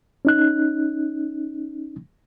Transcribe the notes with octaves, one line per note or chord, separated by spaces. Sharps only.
C#4 D#4 F#6